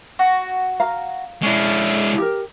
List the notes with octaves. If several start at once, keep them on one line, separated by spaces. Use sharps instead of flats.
F#4
F5 A#5
G#3 C#4 D4 E4
G4 A#4